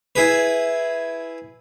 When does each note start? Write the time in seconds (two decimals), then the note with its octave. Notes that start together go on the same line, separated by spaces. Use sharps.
0.15 E4 G#4 B4